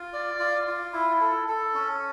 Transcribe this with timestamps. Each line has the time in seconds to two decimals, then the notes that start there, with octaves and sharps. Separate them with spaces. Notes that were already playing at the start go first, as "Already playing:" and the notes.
Already playing: F4
0.13 D5
0.40 F4
0.67 F4
0.93 E4
1.21 A4
1.48 A4
1.74 C#4